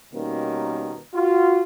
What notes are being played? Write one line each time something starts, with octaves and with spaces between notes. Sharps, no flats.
B2 D#3 G3 A#3 C#4
F4 F#4